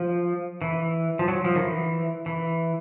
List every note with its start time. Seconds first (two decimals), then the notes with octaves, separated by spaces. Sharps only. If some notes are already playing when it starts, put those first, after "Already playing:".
Already playing: F3
0.62 E3
1.19 F3
1.28 F#3
1.44 F3
1.56 D#3
1.60 E3
2.26 E3